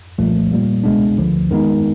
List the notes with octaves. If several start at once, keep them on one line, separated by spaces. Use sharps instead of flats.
C2 A#2 F3 A3
A#2 G3 A#3
C#2 B2 G#3 B3 D4
D2 D3 F3
G2 D#3 G#3 B3 D#4